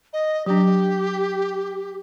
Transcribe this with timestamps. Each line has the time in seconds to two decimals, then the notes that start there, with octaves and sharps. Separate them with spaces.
0.13 D#5
0.46 F#3 D4 G4